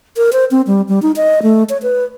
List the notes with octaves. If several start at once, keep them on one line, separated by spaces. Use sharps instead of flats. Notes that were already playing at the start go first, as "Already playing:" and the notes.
A#4
C5
C4
G3
G3
D#4
D#5
A3
C#5
B4